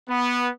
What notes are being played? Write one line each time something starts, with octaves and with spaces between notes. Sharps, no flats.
B3